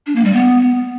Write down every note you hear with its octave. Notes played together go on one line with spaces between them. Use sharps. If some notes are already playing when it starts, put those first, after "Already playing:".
D4
A#3
G3
B3